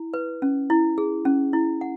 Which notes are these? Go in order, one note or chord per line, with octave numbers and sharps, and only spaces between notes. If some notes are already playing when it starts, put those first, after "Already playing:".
Already playing: E4
B4
C#4
E4
G#4
C#4
E4
F#5